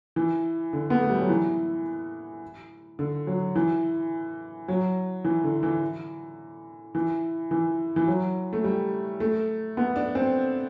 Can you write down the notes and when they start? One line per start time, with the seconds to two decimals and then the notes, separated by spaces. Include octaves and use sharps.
0.16 E3
0.73 D3
0.90 B3
1.00 A3
1.10 G3
1.19 F#3
1.29 E3
2.99 D3
3.27 F#3
3.56 E3
4.68 F#3
5.25 E3
5.44 D3
5.63 E3
6.95 E3
7.51 E3
7.96 E3
8.07 F#3
8.53 A3
8.64 G3
9.20 A3
9.77 B3
9.96 D4
10.15 C4